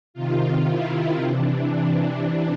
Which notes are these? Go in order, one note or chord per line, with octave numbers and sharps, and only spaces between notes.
C3 D#3 F4
E4
C3 E3 D4
D4